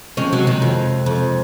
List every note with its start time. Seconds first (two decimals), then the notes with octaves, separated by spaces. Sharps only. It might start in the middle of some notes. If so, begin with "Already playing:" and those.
0.17 C3 F3 G#3 C#4
0.33 F#3
0.47 D#3
0.62 F2
1.06 F2